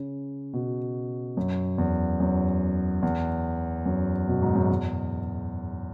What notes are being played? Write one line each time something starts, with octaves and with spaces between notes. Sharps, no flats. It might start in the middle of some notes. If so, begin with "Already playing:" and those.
Already playing: C#3
B2
F#2
E2
F#2
E2
F#2
B2
G#2
F#2
E2